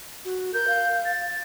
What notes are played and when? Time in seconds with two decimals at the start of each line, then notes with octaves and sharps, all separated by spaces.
0.25 F#4
0.54 A#4 G6
0.68 F5
1.05 A6